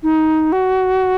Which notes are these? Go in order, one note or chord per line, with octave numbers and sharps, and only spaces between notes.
D#4
F#4